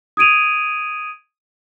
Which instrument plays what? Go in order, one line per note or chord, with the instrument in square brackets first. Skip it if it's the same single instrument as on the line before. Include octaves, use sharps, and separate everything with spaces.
[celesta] D#6 G#6 D7 D#7 F7